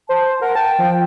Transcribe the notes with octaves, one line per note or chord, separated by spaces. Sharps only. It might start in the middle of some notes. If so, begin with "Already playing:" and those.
C5 A5
A#4 F#5
G5 A5
F3